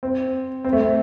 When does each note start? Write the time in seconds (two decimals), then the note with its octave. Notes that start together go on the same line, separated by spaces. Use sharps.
0.03 C4
0.64 C4
0.73 A3
0.80 C4